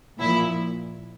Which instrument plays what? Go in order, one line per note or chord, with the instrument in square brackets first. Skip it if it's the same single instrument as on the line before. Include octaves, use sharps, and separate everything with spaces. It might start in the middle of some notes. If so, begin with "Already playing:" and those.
[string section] A#2 F3 E4